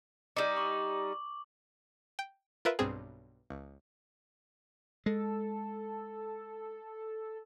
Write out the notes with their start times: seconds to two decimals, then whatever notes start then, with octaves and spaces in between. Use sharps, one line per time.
0.37 G3 D#4 D6
0.57 C#6 D6 F#7
2.19 G5
2.65 F4 A#4 B4 E5
2.79 B1 G2 C4 G#4
3.50 C#2
5.06 G#3 A4